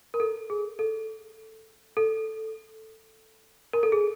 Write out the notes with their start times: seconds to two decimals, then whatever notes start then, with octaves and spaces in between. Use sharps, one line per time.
0.14 A#4
0.20 A4
0.50 G#4
0.79 A4
1.97 A4
3.73 A#4
3.83 A4
3.92 G#4